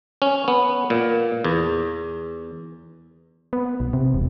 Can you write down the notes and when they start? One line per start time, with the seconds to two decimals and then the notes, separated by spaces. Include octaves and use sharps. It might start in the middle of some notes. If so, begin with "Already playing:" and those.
0.22 C#4
0.48 B3
0.90 A#2
1.44 E2
3.53 B3
3.80 B1
3.93 C3
4.14 E1